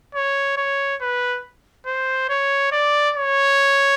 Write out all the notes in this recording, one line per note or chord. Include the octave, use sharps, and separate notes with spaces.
C#5
C#5
B4
C5
C#5
D5
C#5